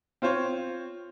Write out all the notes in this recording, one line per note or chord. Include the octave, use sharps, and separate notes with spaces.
C4 F4 C5 C#5